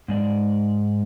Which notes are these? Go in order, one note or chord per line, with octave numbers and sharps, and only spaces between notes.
G#2 G#3 D5